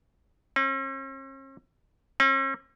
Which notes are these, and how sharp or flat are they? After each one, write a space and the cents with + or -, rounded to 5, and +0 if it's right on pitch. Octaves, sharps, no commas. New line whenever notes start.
C#4 -45
C#4 -45